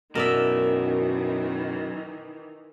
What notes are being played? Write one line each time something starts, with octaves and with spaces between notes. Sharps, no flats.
F#2 B2 D#3 E3 A#4 D5 E5